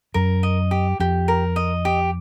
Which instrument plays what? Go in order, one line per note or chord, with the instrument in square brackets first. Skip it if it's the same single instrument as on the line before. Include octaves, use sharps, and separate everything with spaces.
[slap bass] F#2 [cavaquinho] A#4
[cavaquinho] D#5
G4
[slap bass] F2 [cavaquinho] G4
[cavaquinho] A#4
D#5
G4